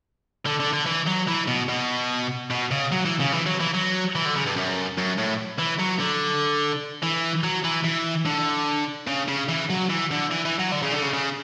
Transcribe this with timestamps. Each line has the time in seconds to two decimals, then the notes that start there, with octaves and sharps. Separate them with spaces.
0.46 D3
0.60 D3
0.73 D3
0.86 E3
1.07 F#3
1.28 E3
1.48 B2
1.69 B2
2.51 B2
2.71 C#3
2.92 F#3
3.05 E3
3.20 C#3
3.33 E3
3.46 F#3
3.60 E3
3.74 F#3
4.15 E3
4.25 D3
4.36 C#3
4.46 G2
4.56 F#2
4.97 F#2
5.18 A2
5.59 E3
5.79 F#3
6.00 D3
7.03 E3
7.44 F#3
7.65 E3
7.85 E3
8.26 D3
9.07 C#3
9.28 C#3
9.49 E3
9.70 F#3
9.90 E3
10.11 D3
10.31 E3
10.45 E3
10.59 F#3
10.72 D3
10.83 C#3
10.92 D3
11.02 C#3
11.13 C#3